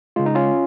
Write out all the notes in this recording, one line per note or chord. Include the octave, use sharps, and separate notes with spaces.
C#3 G#3 F4
D#4
C#4 F4